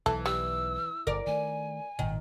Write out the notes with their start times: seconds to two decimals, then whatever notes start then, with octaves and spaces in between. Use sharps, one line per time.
0.06 B1 E3 A4
0.26 G3 E6
1.07 G1 D3 A#4 D5
1.27 D#3 A3 G#5
1.99 G#1 A#2 D#3